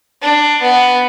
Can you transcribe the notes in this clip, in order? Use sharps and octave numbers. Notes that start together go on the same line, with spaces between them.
D4
B3